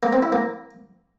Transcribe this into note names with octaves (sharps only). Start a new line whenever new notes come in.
A#3
C4
E4
A#3